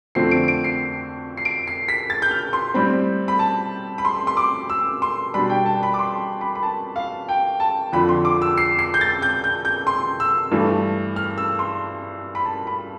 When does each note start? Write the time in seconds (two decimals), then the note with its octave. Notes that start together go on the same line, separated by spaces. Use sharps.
0.15 F2 D3 F3 A3 C4 C7
0.31 D7
0.48 D7
0.64 C7
1.37 C7
1.45 D7
1.67 C7
1.88 B6
2.10 A6
2.22 G6
2.31 F6
2.53 C6
2.74 A2 G3 C4 B5
3.28 B5
3.39 A5
3.98 B5
4.05 C6
4.27 C6
4.37 D6
4.70 E6
5.02 C6
5.34 B2 G3 D4 B5
5.50 G5
5.66 A5
5.83 B5
5.94 D6
5.99 C6
6.41 B5
6.55 B5
6.63 A5
6.96 F5
7.29 G5
7.60 A5
7.93 F2 D3 F3 B5
8.09 C6
8.25 D6
8.42 E6
8.58 C7
8.79 C7
8.94 G6
9.01 A6
9.22 G6
9.44 G6
9.65 G6
9.87 C6
10.20 E6
10.52 G2 E3 A3
11.16 F6
11.38 E6
11.59 C6
12.35 B5
12.45 A5
12.67 B5